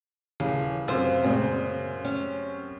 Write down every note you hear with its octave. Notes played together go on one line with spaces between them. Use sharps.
D#1 C#3 E3
F#2 C3 F4 C5
A#2 C#3 G#3 C4
C#4